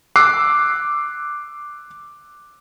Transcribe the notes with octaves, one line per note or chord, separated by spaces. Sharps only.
D6 E6 F#6 C7